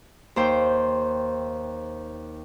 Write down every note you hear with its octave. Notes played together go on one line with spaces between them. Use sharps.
D#2 C5 G5